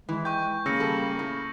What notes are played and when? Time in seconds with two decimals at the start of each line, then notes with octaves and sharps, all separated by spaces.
0.09 E3 G#3
0.25 G5 C#6 G6
0.66 C#3 A#3 E6 A#6 C#7
0.80 G3 A4
1.19 A2